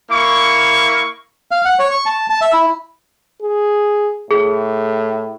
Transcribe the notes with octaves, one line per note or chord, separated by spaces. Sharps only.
A#3 E4 C#6
F5
F#5
C#5
C#6
A5
A5
E5
E4
G#4
A2 G#4